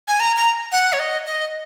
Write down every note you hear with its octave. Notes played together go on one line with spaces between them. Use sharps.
G#5
A#5
A#5
F#5
C#5
D#5
D#5